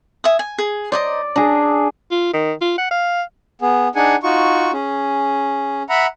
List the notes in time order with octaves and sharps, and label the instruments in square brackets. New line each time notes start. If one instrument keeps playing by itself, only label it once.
[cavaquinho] E5 G#5 D#6
G#5
G#4
[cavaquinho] C5 D#5 A#5 [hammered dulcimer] D5
[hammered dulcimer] D4 G#4 [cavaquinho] A#5
[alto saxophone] F4
D#3
F4
F#5
F5
[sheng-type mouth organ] B3 G#4
D4 D#4 G#4 F#5 G#5
D#4 F4 F#4 C#6
C#4 G#4
E5 F#5 A#5 B5